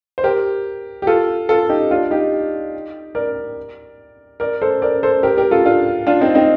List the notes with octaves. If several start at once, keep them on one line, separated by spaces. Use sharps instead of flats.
C5
G4 A#4
G4
F4 A4
F4 A4
D#4 G4
D4 F4
D#4 G4
A#4 D5
A#4 D5
A4 C5
A#4 D5
A4 C5
G4 A#4
G4 A#4
F4 A4
D4 F4
D4 F4
C4 D#4
C4 D#4